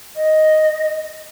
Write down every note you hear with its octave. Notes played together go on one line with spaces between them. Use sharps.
D#5